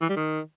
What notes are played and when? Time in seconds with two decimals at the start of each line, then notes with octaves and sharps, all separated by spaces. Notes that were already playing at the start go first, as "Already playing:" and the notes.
0.01 E3
0.09 G3
0.16 D#3